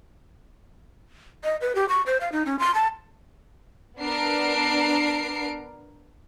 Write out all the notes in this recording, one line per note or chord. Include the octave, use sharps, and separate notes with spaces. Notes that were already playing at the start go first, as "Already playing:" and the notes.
D#5
B4
G4
C#6
C5
F5
D#4
C#4
C6
A5
B3 D4 A#4 C7 D7